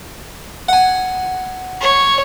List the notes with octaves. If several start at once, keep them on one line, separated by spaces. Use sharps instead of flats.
F#5 G#5
C#5